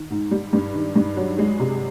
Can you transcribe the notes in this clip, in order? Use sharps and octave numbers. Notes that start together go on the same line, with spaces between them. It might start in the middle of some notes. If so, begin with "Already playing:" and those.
Already playing: D#3
G#2
G3
G2
D#3
G2
F#3
G#3
C3